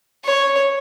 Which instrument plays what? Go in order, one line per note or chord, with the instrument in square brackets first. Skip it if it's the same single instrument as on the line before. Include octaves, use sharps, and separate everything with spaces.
[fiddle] C#5